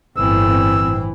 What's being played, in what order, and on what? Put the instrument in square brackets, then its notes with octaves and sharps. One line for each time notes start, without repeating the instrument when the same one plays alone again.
[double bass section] G1 A2 C4 [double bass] E3 [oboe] E6